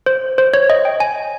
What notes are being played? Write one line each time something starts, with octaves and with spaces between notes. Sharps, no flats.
C5
C5
C#5
D#5
G5
G#5